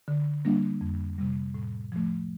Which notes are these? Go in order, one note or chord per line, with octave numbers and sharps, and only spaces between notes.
D3
G3 A#3 D4
F2
C3 G3
A2
F3 A3